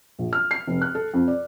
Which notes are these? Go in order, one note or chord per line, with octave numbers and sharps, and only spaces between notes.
A#1
F6
C7
F1
F#6
A4
F2
D5